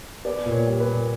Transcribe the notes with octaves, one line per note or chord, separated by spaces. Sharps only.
B3 D5
A#2
C#5
G3
B4
A#2